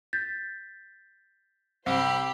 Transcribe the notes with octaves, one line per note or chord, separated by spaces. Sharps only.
G6 A6 B6
C2 G4 C5 B5